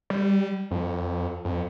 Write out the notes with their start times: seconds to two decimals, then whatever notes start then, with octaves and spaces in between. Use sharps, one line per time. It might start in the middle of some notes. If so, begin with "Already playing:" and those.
0.10 G3
0.71 F2
1.45 F2